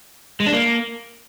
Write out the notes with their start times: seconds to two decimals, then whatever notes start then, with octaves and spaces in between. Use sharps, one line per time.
0.40 G#3
0.46 D4
0.53 A#3